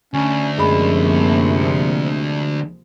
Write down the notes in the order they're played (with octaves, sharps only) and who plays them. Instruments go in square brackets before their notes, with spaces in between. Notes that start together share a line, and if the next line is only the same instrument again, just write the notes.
[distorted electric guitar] D2 [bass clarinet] C#4
[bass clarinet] F#2 [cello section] C3 F3 A#3 [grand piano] G#3 B5